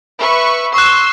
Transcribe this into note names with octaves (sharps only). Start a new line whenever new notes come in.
B4 E5 C#6
C6 C#6 E6 F#6